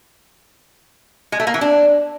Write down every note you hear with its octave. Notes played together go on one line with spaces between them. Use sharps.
G#3
A3
A#3
E3
D4